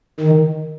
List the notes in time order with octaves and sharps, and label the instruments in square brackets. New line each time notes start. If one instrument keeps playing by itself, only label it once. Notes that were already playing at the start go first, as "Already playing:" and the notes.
[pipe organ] D#3